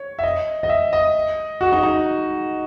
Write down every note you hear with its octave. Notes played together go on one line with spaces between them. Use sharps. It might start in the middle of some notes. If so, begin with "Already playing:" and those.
Already playing: C#5
E5
D#5
D#5
E5
D#5
F#4
D#4
D#4